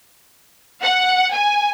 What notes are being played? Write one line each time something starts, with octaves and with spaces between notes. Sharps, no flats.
F#5
G#5